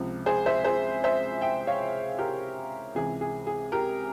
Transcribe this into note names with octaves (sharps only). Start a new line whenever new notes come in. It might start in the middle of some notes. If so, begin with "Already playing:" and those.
Already playing: C#2 C3 F3
G#4 C5
C5 E5
G#4 C5
C5 E5
E5 G5
C#5 F5
G4 A#4
C#2 C3 E3 G#4
G#4
G#4
G4 A#4